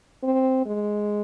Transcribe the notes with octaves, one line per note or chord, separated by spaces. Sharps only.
C4
G#3